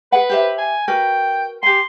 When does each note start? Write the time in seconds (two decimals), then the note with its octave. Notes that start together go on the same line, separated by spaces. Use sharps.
0.12 G#4 B4 F#5
0.30 G4 C5 E5
0.58 G#5
0.88 F#4 A#4 B4 G5
1.63 G4 G#5 C6